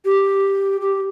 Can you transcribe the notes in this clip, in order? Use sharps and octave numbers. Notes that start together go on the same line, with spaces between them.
G4
G4